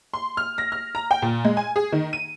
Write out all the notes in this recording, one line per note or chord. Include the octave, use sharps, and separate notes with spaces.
C6
F6
A#6
F6
A#5
G5
A#2
G#3
G#5
G#4
D#3
D#7